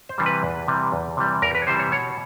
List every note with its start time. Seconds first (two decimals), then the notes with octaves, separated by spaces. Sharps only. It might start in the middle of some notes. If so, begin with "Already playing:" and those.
0.09 C5
0.18 C3 E3 G3
0.26 B4
0.43 E2
0.68 C3 E3 G3
0.92 E2
1.17 C3 E3 G3
1.42 E2 A#4
1.55 B4
1.62 C#5
1.67 C3 E3 G3 C5
1.79 C#5
1.92 B2 C#5